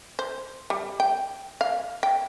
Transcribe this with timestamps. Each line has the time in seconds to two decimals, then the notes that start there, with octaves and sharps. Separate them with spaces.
0.19 C5
0.70 G3
1.00 G5
1.61 F5
2.03 G5